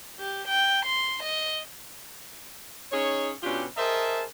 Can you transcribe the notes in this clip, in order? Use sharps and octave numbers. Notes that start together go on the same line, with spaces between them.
G4
G5
C6
D#5
C#4 D#4 G#4 C#5
B2 C#4 D4 F4 G4
G#4 A#4 C5 D#5 E5 A5